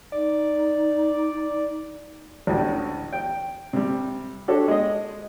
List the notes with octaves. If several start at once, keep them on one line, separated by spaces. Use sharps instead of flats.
D#4 D5
A1 D2 A2
G5
C3 G3
D4 F#4 G4 A4 C#5
G#3 D#5